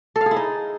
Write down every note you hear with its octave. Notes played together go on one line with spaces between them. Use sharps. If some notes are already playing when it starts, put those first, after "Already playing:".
A4
F5
G#4
E4
D#4